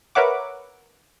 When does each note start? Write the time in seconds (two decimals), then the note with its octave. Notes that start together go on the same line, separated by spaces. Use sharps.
0.15 A#4 B4 C#5 E5 F#5 D6